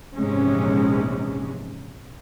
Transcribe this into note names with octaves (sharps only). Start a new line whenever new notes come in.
A#1 E2 G#2 C3 G#3 C#4